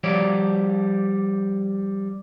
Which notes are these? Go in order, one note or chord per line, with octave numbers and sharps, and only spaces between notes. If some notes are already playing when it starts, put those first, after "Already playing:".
F3 G3 C#5 D5